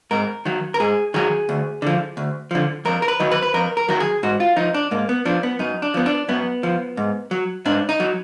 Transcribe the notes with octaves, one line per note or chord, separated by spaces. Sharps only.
G#2 A#4
D#3 F#3
A#4
G#2 G#4
D#3 F#3 G#4
D2
D3 F3
D2
D3 F3
F2 A#4
A#4
B4
D#3 F#3
B4
B4
F2 A#4
A#4
D#3 F#3 A#4
G#4
G#2 F#4
F4
F3 D#4
D4
G#2 A#3
B3
F3 D4
B3
F#2 D#4
D4
F3 B3
D4
F#2 B3
F3
G#2
F#3
G#2 D4
D#4
F#3